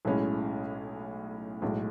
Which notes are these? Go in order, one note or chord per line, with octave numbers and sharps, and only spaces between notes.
B1 A2 G#3 C#4 E4
B1 A2 G#3